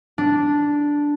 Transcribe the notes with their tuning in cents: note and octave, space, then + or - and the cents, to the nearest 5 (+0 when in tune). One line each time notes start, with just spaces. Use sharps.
D4 -5